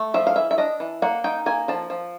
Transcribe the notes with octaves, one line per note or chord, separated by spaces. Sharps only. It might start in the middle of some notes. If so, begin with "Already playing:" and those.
Already playing: A3
F3 E5
F5
E3 E5
E5
D4 D#5
E3
A#3 F#5
D#4 G5
A#3 G#5
F3 A5
F3